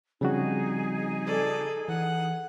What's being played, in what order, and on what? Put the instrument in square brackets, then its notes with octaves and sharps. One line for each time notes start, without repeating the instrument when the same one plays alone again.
[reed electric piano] C#3 F#4 [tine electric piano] F3 G3 C4 [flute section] D#4 G#4
[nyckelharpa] A4 D5
[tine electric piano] E3 [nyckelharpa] F#5